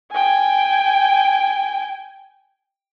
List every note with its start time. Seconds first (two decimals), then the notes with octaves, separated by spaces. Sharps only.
0.12 G5 G#5